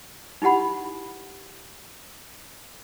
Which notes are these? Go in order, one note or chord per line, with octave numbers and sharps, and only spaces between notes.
D#4 E4 G4 F#5 B5